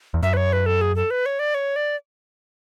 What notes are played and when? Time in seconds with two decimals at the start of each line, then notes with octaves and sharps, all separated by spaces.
0.14 E2
0.22 F#2 E5
0.33 B4
0.37 C#5
0.53 B4
0.66 A4
0.81 G#4
0.96 A4
1.11 B4
1.26 C#5
1.39 D5
1.54 C#5
1.76 D5